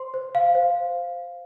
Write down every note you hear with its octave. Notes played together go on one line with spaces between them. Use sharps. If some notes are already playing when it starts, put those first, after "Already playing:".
Already playing: C5 C6
C5
F5
C5